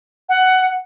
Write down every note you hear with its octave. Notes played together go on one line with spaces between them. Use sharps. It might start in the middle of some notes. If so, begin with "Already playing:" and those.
F#5